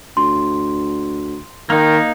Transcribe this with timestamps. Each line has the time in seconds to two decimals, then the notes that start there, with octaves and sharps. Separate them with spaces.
0.17 D2 C6
1.70 D#3 A#3 D#4